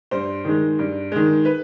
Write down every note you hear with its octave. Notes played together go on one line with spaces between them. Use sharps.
G2 C5
D#3 G#3
G2
D#3 G#3
B4